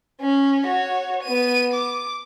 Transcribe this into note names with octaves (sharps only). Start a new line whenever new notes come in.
C#4
F#4 C#5
B3 D#7
D6